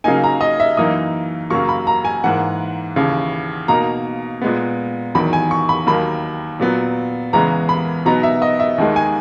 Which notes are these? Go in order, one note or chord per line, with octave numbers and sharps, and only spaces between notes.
C#3 F#3 A#3 D#4 G#5
A#5
D#5
E5
F#2 E3 A#3 D#4 D#6
F#2 C#3 F#3 A#3 C#6
B5
A#5
G#5
G#2 E3 A#3 F#5
D#2 C#3 E3
B2 A#3 D#4 A#5
A#2 G#3 B3
E2 D#3 F#3 B5
G#5
C#6
B5
D#2 D#3 F#3 A#3 B5
A#2 F#3 B3
E2 C#3 E3 G#3 B3 A#5
B5
B2 F#3 B3 D#4 A#5
E5
D#5
E5
D#2 D#3 G#3 D#4
G#5